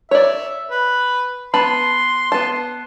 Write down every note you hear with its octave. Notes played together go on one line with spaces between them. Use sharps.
C#5 D5 E5
B4
B3 A5 B5 C6
B3 A5